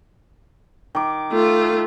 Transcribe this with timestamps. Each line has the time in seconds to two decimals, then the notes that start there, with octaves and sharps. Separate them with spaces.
0.95 D#3 D6
1.32 A3 F4